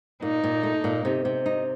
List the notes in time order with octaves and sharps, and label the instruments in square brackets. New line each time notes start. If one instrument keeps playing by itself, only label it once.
[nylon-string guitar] A#2 [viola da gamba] D#4
[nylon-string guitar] A#2
A3
A#2
C3
C3
D#4